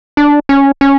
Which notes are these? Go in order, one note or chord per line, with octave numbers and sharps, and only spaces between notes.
D4
C#4
C#4